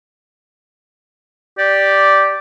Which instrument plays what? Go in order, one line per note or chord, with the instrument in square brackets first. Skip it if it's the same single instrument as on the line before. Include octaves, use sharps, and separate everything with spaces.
[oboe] G4 [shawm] D5